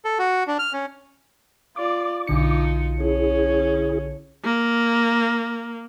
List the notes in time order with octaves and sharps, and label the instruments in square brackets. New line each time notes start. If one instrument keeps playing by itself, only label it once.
[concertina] A4
F#4
D4
F6
C#4
[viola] F4 D5 [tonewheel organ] D6
[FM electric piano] B1 D3 C#7 [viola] D#4 F4
[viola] C#4 [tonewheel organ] E4 G#4
[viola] A#3